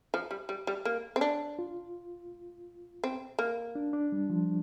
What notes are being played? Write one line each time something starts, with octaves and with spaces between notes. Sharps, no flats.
F3
G3
G3
G3
A#3
C4
D4
F4
C4
A#3
D4
D4
G3
F3